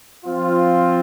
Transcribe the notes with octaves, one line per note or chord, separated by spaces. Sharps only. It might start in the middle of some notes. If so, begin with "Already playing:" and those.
F3 C4 F4